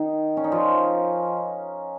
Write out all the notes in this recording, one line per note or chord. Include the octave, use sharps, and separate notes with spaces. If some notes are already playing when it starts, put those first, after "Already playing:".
Already playing: D#3 D#4
C#4
D#4
F3 F4